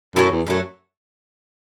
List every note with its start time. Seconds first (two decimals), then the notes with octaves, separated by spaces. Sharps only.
0.16 F#2 F#3 A3 E4 A4
0.31 E2
0.47 F#2 F#3 A3 E4 A4